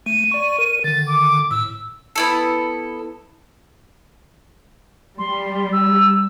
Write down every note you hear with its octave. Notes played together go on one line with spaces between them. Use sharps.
A3 D#7
D5 C#6
A#4
D3 D#3 A6
D6
A2 E6
B3 E4 A4
G3 C6
E6